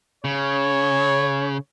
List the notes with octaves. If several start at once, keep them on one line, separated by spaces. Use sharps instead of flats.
C#3 C#5